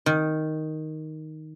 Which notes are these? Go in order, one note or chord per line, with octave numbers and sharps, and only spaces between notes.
D#3